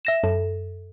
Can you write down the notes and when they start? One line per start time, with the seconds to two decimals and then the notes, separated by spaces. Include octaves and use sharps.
0.05 E5 A#6 E7
0.23 F#2 A4